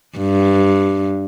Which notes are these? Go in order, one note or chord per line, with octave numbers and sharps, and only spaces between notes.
G2